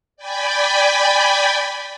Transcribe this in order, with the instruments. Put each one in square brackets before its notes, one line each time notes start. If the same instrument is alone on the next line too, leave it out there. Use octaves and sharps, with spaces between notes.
[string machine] D5 G5 G#5 B5